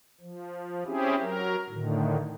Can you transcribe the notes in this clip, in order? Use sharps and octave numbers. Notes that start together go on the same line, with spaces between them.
F3
C4 C#4 E4 G4 G#4
F#3 A#4
A2 D3 D#3